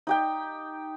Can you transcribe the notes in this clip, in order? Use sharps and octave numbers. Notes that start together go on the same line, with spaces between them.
D#4 G4 G5